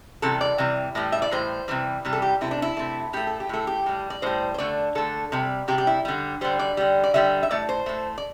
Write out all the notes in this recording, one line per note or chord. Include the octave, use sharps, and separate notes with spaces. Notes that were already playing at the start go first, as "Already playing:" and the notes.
C3 E3 G3 A4
D5
C3 E3 G3
A2 E3 G3
E5
D5
A2 E3 G3 C5
C3 E3 G3
C3 E3 G3
A4
G4
C3 A3 E4
D4
E4
C3 A3
A2 A3 G4
A4
G4
A2 A3 A4
G4
A2 G3
D5
A2 G3 C5
C5
D3 A3 D5
D3 A3 A4
C3 G3
C3 G3 G4
G4
E4
D3 G3
D3 G3 C5
D5
D3 G3
D5
D3 G3 E5
E5
A2 A3 D5
C5
A2 A3
D5